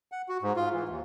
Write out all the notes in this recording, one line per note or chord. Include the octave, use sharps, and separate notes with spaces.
F#5
F#4
G#2
F4
E3
D#2